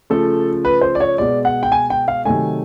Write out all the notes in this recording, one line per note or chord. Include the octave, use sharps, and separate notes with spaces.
C#3 F3 A3 A4
B4
C5
D5
C#5
B2 G#3 D5
F#5
G5
G#5
G5
F5
C3 D#3 F#3 A3 G#5